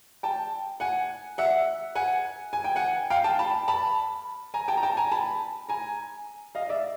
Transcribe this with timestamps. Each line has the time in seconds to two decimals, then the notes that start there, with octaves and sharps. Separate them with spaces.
0.23 G5 A5
0.80 F#5 G#5
1.38 E5 F#5
1.95 F#5 G#5
2.53 G#5
2.64 G5
2.76 F#5 G#5
3.10 F5 G5
3.24 G5 A5
3.39 A5 B5
3.68 A5 B5
4.54 G#5 A#5
4.68 G5 A5
4.77 A#5
4.83 G5 A5
4.97 G#5 A#5
5.12 A5 B5
5.69 G#5 A#5
6.55 D#5 F5
6.69 D5 E5